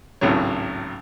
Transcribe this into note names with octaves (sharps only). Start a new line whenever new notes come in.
G#1 C#2 A2 F#3 C#5